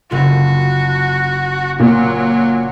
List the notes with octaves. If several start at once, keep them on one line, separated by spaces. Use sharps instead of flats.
F#1 F4 F#4
A#2 F#3